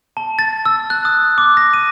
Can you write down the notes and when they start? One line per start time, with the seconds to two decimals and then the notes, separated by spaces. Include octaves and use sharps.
0.17 A5
0.39 A6
0.66 E6
0.90 F#6
1.05 D#6
1.38 D6
1.57 A#6
1.74 D#7